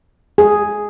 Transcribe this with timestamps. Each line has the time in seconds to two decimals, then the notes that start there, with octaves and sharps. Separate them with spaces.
0.38 G#4